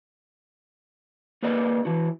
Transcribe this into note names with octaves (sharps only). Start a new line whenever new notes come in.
A#3 G#4 A#4 B4 D5 D#5
E3 E4 F#4